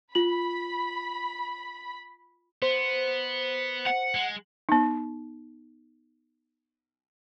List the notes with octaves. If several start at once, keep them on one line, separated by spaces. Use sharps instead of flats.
F4 B5 F#7
B3 C5
F#5
G#3
B3 D#4